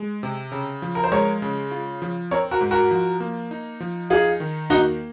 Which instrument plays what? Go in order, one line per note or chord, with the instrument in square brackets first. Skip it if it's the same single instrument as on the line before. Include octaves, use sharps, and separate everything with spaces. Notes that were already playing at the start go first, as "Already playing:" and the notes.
Already playing: [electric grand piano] G#3
C3
C#3
F3
[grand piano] A#4
C5
[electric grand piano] G#3 [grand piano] A#4 C#5
[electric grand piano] C#3
F4
F3
[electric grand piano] C4 [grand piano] A#4 C#5
[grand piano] F#4 A#4
[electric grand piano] G#2
[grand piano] F#4 A#4
[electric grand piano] F3
A#3
D#4
F3
[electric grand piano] D#4 [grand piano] F4 G#4
[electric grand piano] D#3
[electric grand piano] A#3 [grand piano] D#4 F#4